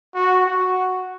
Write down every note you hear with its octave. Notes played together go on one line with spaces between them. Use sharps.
F#4
F#4